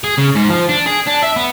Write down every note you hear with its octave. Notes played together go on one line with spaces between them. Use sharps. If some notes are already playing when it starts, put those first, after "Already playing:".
G#4
C#3
G#2
F3
D4
G#4
D4
E5
B3